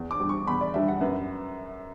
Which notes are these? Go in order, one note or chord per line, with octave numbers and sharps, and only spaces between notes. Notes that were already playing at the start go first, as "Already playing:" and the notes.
Already playing: E2
D6
D3 G3
C#6
E2 B5
D5
D3 G3 E5
F#5
F#2 B4